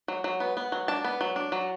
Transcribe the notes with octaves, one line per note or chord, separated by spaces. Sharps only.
F#3
F#3
B3
B3
F#3
D4 A5
B3
F#3
D4
F#3